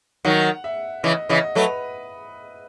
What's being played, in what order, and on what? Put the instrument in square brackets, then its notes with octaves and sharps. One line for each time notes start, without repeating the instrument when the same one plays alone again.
[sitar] D#3 F#3 [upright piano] F#5
[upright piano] E5
[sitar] C#3 E3 [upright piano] D#5
[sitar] C#3 E3 [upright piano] D#5
[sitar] F#3 A3 [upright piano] B4